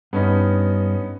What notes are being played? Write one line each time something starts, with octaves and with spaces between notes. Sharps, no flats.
G2 B3 C#4 D#4